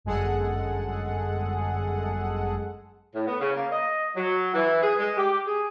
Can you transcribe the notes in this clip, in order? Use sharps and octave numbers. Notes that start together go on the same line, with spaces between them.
G1 F#2 G#3 G#4 A4 F#5
A2
B3
C#3
A#3
D#5
F#3
E3
G#4
G#3
G4
G#4